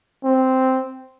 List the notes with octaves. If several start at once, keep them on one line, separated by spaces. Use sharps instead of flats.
C4